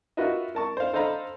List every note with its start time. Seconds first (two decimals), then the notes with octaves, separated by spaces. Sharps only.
0.17 F4 F#4 A#4 B4 D#5 E5
0.55 A#4 A5 C#6
0.77 C5 F5
0.93 A4 C5 D#5 F5 A#5 B5